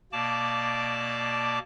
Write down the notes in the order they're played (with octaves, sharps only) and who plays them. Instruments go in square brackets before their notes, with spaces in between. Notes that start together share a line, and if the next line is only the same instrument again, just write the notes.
[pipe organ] B2 A#3 D5 A5 D6